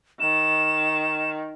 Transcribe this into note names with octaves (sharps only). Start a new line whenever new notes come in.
D#3 E7